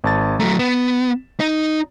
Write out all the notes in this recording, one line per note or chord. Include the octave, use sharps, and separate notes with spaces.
G#1 A5 A6
F#3 A3 A#5
B3 E7
D#4